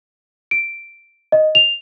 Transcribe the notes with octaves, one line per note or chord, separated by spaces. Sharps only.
D7
D#5
F7